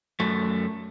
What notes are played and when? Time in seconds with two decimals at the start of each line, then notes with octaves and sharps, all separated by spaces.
0.20 F#2 A3